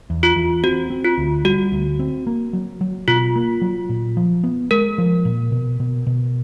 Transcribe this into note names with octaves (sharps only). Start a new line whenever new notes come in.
E2
F4
E2
C4 F#4
C4
F4
D2
G3 F#4
D2
C4
A#3
F#3
F#3
B2 F4
A#3
F#3
A#2
F3
B3
G#3 A#4
F3
A#2
B2
B2
B2